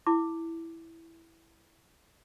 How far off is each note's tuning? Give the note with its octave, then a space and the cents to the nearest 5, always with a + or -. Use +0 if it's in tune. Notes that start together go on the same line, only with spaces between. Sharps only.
E4 +0 D6 +0